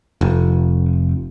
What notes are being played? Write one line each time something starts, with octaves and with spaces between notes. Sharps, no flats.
F1